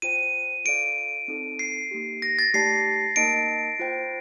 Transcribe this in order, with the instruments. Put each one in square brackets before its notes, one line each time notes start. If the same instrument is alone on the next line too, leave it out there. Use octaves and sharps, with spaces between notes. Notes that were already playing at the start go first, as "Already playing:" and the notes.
[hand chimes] F4 C5 G5 [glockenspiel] D#7
[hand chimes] F4 A4 D5 F5 [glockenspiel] D7
[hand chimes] C4 D#4 A4
[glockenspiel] C7
[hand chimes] A#3 D#4 G4
[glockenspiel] A#6
A6
[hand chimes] A3 D#4 G4 D5 A5 [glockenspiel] C7
[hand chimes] A#3 D#4 A#4 D#5 A5 [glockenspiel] D7
[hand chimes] F4 C5 G5